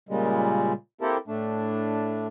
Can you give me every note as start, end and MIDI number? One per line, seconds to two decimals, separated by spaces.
0.09 0.73 46
0.09 0.73 49
0.09 0.73 55
0.09 0.73 56
1.01 1.17 58
1.01 1.17 60
1.01 1.17 64
1.01 1.17 67
1.01 1.17 69
1.01 1.17 70
1.27 2.27 45
1.27 2.27 57
1.27 2.27 62